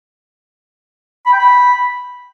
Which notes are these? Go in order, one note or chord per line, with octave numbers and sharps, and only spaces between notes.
B5
G5
B5